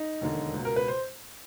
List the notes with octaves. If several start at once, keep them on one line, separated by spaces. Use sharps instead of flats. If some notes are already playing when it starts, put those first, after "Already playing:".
Already playing: D#4
E1 D#2 D3
C#2 B2
A#4
B4
C5